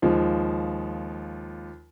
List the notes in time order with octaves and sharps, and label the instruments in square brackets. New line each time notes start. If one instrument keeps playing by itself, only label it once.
[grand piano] D#2 F3 G#3